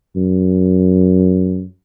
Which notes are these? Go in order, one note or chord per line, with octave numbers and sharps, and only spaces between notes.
F#2